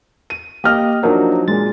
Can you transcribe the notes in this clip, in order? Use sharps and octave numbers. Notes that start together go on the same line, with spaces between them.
D#7
A#3 G4 D#5 F6
F3 F#3 D4 D#4 A#4
A#2 G#3 A6